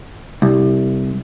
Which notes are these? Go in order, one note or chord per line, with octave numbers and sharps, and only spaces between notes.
C2